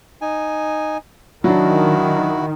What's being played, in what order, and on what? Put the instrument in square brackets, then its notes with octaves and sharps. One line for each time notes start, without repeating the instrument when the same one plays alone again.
[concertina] D#4 G#5
[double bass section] D#3 [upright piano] F#3 D4 [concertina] E4 F#4